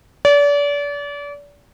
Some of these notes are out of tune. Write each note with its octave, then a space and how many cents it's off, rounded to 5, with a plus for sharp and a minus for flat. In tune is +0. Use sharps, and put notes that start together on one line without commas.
D5 -35